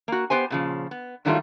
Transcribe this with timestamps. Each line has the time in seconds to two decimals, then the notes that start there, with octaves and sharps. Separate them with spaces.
0.08 A#3 F#4
0.30 B3 G4 C5 G#5
0.50 A#2 C#3 F3
0.91 B3
1.25 G2 D#3 F#3 G3 A3 F4